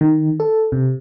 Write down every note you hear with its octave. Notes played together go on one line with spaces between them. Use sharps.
D#3
A4
C3